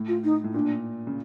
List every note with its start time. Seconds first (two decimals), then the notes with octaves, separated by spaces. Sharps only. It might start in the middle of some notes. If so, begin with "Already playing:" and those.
Already playing: A2
0.08 F4
0.24 D#4
0.44 A2
0.54 A#2 D4
1.07 C#3